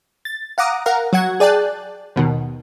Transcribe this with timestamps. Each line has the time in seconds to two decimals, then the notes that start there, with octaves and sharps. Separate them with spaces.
0.25 A6
0.58 F5 F#5 A#5 D6 D#6
0.86 A#4 F5 F#5 A#5
1.13 F#3 F#4 F#5 G#6
1.40 G#4 D5 G5 A5 F#6
2.16 D#2 B2 D#3